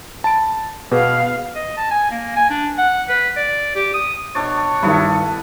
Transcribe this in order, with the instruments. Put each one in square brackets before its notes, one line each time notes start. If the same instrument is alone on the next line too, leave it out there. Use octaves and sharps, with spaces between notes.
[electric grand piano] A5 B5 D7
[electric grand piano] B2 [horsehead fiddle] B3 F5 [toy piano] G#4 B4
[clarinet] D#5
A5
G#5
A#3
G#5
D4
F#5
B4
D5
G4
D#6
[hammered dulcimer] B2 D4 D5 [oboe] C#5
[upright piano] G2 D#3 [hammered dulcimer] B3 E4 A4